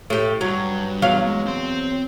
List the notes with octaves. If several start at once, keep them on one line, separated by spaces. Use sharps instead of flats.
A2 G4
G2 F#3
E2 F#3 F5
G#3
C4 C6